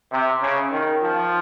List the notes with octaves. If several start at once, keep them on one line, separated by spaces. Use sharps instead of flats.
C3
C#3
D#3
F3